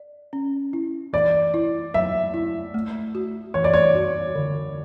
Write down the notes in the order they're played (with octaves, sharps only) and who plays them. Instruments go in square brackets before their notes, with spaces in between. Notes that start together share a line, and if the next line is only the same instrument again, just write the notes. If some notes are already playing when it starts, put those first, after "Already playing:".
Already playing: [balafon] D5
C#4
E4
[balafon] E3 [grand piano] D5
[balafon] E4
[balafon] F#3 [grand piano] E5
[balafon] E4
A3
F#4
[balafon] E3 [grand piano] C#5
[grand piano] D5
C#5
[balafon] F#4
D3